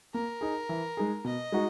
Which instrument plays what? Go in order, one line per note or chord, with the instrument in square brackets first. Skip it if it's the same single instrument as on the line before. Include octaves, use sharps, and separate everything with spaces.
[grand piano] A#3 [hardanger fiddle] A#4
[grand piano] D#4 G#4
E3
G#3 D#4 G#4
[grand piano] B2 [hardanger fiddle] D#5
[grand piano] G#3 D#4 F#4